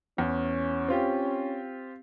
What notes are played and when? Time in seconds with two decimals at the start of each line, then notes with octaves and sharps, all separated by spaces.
0.18 E2 C#4
0.88 C4 F4 G4